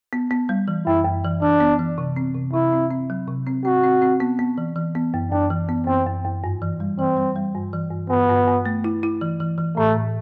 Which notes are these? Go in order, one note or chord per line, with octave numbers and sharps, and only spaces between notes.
B3
B3
G3
E3
F#2 E4
F#2
E3
E3 D4
B3
E3
C3
C4
C3
C3 E4
C4
C4
F#3
C3
C4
C4 F#4
C4
C4
B3
B3
E3
E3
B3
F#2
F#2 D4
E3
B3
F#2 C4
F#2
F#2
G2
E3
G3
E3 C4
G3
G3
G2
E3
G2
G2 B3
G2
G2
A3
E4
E4
E3
E3
E3
A2 A3
A2